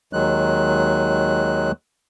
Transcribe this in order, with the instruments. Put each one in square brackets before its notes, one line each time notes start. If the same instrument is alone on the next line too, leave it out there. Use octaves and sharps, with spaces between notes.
[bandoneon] D#2 D#3 F#3 G#3 F#6